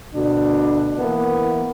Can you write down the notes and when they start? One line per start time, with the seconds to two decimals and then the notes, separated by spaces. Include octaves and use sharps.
0.15 D2 B2 D4
0.99 E3 A#3 B3